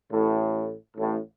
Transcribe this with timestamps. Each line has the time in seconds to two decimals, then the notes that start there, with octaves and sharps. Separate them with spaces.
0.12 A1 A2
0.97 A1 A2